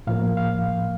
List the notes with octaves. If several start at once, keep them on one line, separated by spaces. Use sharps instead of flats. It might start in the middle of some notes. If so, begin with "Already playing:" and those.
A2 F3 A#3 F5
F5